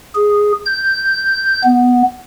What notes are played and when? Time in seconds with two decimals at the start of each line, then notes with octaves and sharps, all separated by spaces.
0.15 G#4
0.66 G6
1.64 B3